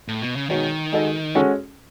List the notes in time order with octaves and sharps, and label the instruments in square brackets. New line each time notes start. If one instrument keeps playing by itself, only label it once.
[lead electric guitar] A2
B2
C#3
[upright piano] B2 G#3 D#4 F#4 C#5 [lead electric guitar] D#3
[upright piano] G#3 D#4 F#4 A4 D#5
G#3 C#4 F#4 A4 C#5